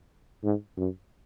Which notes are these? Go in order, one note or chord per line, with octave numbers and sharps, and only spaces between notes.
G#2
F#2